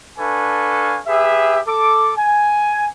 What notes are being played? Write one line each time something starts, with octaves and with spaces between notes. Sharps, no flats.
D4 A4 B4 F5 G#5 C#6
G4 G#4 B4 E5
A4 D6
G#5